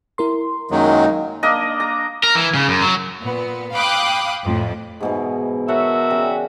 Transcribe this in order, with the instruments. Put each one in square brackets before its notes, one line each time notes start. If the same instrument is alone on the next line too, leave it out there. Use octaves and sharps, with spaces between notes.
[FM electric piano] E4 A#4 C6
[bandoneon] F#2 D#3 F#3 [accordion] G#3 A#3 D#4
[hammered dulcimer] A#3 D4 D#5
A#5
[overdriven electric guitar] A#4
E3
C#3
F#2
F#3
[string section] A#2 B3
F5 G5 B5 D6 D#6 F#6
F2 A2
[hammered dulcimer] G#2 B2 E3
[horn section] F#4 A#4 E5 [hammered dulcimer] A4 C#5
[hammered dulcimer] C#3 D5 G5